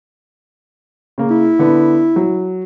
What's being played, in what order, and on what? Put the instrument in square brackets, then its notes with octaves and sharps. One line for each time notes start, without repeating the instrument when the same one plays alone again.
[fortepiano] C#3 A#3
[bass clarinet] E4
[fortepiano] D3 B3
F#3